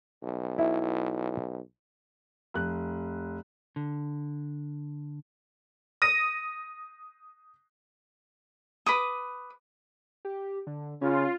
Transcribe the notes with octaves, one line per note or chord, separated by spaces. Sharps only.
B1
E4
F1 F#6
D3
D#6 A#6 D#7
B4 D6 D#6
G4
D3
C#3 C#4 F4